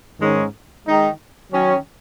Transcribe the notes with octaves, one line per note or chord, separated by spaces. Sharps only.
G#2 D#3 G#3 C#4
D#3 G#3 D#4
D#3 F#3 C#4